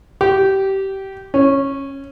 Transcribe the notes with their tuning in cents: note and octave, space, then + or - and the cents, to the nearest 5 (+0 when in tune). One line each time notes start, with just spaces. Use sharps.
G4 -20
C#4 -15